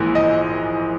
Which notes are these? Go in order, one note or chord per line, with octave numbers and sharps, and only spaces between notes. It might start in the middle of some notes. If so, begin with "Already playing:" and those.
Already playing: A#1 G#2 E3 A#3
D#5